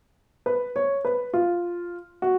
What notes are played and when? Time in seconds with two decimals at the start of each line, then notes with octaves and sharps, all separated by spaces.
0.46 B4
0.76 C#5
1.05 B4
1.34 F4
2.22 F#4